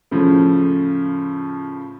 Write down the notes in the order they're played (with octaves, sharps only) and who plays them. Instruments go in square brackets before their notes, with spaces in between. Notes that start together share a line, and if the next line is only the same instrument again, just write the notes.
[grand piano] A2 C#3 F3